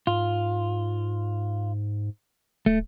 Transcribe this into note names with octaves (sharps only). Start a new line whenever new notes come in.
G#2 F4
D1 A3